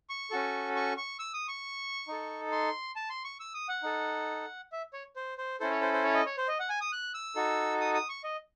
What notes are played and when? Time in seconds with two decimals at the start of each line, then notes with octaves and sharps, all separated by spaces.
0.09 C#6
0.31 C#4 F#4 A4
0.76 C#6
0.97 C#6
1.19 E6
1.34 D#6
1.48 C#6
2.08 D#4 A4
2.52 C6
2.96 A5
3.10 C6
3.24 C#6
3.40 E6
3.54 D#6
3.69 F#5
3.83 D#4 A4
4.72 E5
4.93 C#5
5.16 C5
5.38 C5
5.60 C#4 E4 A4 C5
5.70 C#5
5.82 C5
5.93 C5
6.04 C#5
6.14 D#5
6.26 C#5
6.38 C5
6.48 D#5
6.59 F#5
6.69 G#5
6.81 D#6
6.92 F#6
7.14 E6
7.36 D#4 F#4 A4
7.81 D#6
7.94 D#6
8.09 C#6
8.24 D#5